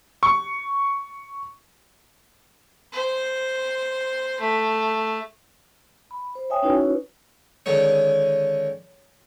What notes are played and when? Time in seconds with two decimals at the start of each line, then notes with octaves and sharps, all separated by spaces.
0.23 C#6
2.93 C5
4.40 A3
6.11 B5
6.35 C5
6.50 C#5 E5 G5 G#5 D#6
6.62 C#4 D#4 E4 F#4 B4 C#5
7.66 D3 D#3 G#3 C#4 C#5